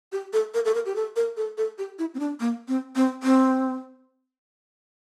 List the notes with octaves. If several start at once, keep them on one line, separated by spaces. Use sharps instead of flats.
G4
A4
A#4
A4
A#4
G4
A4
A#4
A4
A4
G4
E4
C4
D4
A#3
C4
C4
C4